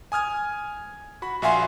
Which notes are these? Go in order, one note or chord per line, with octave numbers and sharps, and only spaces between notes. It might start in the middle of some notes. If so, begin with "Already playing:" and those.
G#5 D#6 F6 G#6
F#4 B5
A#1 F#4 E5 F5 G#5 C6